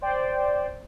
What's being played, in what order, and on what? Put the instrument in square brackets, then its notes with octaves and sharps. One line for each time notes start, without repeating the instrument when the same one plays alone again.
[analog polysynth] C5 D5 G5